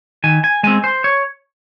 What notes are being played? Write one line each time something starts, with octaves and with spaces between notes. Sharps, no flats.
D#3 G#5
G#5
G#3 C4 G#5
C5
C#5